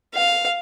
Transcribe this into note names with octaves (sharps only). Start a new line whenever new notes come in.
F5